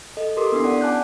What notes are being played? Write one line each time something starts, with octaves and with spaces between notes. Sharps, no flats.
A4 D#5
G4 A4 A#4 C6 D6 D#6
B3 D4 E4 C7
C#4 D5 F#5
F#5 G#5 A5 D6 F#6 G6